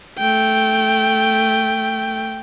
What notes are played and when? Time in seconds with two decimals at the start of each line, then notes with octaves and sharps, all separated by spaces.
0.18 A3 G5